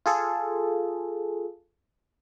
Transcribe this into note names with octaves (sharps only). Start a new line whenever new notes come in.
F4 G#4 A4